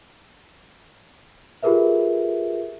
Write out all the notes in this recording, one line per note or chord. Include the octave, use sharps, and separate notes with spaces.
F4 G4 G#4 A#4 B4 E5